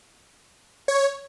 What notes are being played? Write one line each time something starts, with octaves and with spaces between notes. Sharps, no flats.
C#5